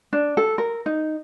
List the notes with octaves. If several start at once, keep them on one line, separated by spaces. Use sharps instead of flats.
D4
A4
A#4
D#4